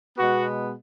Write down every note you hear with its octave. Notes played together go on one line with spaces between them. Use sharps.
B2 G#3 B3 F#4